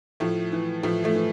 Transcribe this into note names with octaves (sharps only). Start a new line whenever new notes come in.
A2 F3 A3
E3
A2 F3 A3
F3 A3
E3